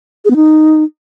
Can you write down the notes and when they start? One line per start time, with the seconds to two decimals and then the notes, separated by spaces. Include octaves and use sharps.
0.25 G#4
0.30 B3
0.36 D#4